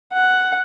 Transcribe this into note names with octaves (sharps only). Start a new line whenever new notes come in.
F#5